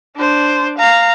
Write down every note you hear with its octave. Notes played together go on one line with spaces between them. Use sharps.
D4 C5
F5 A#5